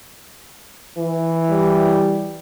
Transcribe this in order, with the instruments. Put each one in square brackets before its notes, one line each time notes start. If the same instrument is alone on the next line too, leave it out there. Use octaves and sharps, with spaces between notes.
[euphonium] E3
[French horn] G3